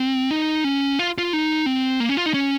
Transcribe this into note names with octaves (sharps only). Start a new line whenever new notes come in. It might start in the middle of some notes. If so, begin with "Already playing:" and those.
Already playing: C4
D#4
C#4
F4
F4
D#4
C4
A#3
C#4
F4
D#4
C#4